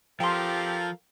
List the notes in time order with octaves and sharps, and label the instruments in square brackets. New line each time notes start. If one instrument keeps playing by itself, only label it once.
[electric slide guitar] F3 [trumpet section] C4 G4 [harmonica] A4 A#4 F5 [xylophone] G5 C6